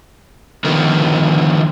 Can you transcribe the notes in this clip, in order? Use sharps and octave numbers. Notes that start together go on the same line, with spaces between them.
D3 D#3 F3 A#3 B3